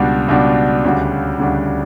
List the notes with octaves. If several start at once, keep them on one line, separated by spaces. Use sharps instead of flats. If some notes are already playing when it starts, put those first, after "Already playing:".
Already playing: C#2 B2 G3 D4 F#4
C#2 B2 G3 D4 F#4
D2 C#3 G3 D4 F#4
D2 C#3 G3 D4 F#4